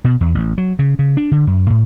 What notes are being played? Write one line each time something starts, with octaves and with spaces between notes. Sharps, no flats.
B2
E2
A1
F#3
C#3
C#3
D4
D3
F#2
A2